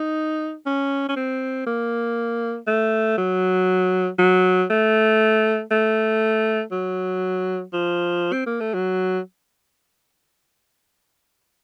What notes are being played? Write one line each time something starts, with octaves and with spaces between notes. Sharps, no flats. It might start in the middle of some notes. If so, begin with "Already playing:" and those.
Already playing: D#4
C#4
C#4
C4
A#3
A3
F#3
F#3
A3
A3
F#3
F3
C4
A#3
A3
F#3